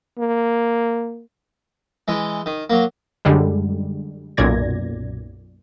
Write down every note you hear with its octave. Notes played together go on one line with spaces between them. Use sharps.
A#3
E3 G#3
D#3
F#3 A#3
F#2 D3 G3 G#3
B1 F#2 A#2 D5 G#6 A#6